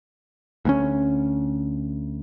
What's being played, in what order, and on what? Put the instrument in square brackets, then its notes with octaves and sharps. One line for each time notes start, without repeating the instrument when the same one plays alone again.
[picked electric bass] D2 G#3 C#4